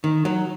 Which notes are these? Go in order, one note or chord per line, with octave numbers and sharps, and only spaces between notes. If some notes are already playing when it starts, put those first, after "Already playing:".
D#3
F#3